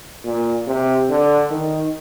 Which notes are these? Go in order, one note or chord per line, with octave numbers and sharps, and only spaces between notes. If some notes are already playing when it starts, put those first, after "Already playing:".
A#2
C3
D3
D#3